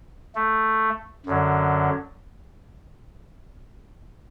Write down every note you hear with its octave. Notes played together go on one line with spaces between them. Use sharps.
A3
F#2 D3 F#3